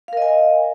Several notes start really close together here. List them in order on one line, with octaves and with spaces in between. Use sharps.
F5 A#4 D#5 G#5